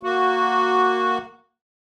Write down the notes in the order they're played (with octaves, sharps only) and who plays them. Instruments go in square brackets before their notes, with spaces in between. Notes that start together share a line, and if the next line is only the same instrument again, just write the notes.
[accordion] A#3 F#4